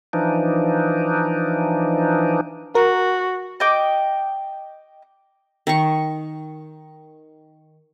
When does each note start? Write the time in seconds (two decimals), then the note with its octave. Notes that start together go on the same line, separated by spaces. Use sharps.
0.13 E3 F3 D4 D#4
2.75 F#4 A#4
3.60 D#5 G5 D6
5.67 D#3 C#6